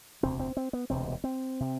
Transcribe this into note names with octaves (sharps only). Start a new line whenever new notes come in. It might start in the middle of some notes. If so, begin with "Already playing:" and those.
E1 D2 C3 C4
C4
C4
B3
E1 D2 C3 C4
C4
C3